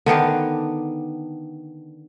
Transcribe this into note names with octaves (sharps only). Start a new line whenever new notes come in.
D3 D#3 B3 D4